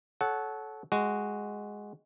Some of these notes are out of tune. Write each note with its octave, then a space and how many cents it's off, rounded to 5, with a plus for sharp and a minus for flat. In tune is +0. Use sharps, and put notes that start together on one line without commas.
A4 -25 C#5 +0 F#5 +0
G#3 -5 F#4 +0